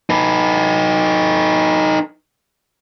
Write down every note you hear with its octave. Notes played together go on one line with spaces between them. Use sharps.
D#4 B4